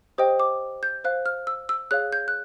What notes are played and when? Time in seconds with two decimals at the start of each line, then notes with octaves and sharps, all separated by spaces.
0.18 G4 C5 D#5 G5 D#6
0.40 D6
0.83 G6
1.04 C5 F5 F#6
1.26 F6
1.47 E6
1.69 E6
1.91 G#4 C#5 F5 F#6
2.13 G6
2.28 F#6